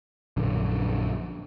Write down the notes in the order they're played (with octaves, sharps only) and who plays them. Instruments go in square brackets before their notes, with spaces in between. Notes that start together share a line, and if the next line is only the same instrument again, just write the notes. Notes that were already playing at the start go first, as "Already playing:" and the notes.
[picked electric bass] A#1 F#2 D3